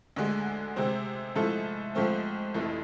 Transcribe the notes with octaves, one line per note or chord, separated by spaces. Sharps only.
D2 D3 G#3
C3 G#3 C4
G#2 F3 A3 E4 A4
G#2 F3 A3 C4
F1 F2 E3 A3